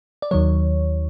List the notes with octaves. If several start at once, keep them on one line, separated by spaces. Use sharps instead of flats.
D5
D#2 D#3 F#3 C#5